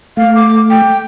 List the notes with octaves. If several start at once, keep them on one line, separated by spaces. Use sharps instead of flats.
A3 F5
D6
G5